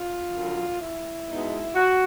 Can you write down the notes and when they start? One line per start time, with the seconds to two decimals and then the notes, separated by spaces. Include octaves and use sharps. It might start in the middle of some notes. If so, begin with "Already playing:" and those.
Already playing: F4
0.33 F#2 D3 F3
0.81 E4
1.28 B2 G#3 B3 D#4
1.75 F#4